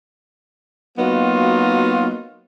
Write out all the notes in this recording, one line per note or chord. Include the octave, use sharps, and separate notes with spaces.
F#3 A#3 B3 D#4 F4 F#4